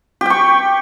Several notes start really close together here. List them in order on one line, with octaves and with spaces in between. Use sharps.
G4 G5 C#6